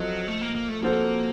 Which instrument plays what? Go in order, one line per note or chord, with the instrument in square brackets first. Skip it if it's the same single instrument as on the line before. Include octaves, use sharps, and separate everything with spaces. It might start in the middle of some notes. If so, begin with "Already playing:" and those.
Already playing: [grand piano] F3 C4 F4 A4 D#5 [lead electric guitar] F#3
[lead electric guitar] A3
A#3
A#3
A3
[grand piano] F3 C4 F#4 A4 C5 [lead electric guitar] A#3